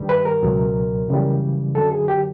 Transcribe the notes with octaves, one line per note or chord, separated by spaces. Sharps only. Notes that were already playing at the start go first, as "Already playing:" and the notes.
Already playing: G2 D#3 G3
B4
A#4
C#2 B2 F#3
F#2 C#3 E3 G3
F#2 D3 F#3 A4
G#4
G4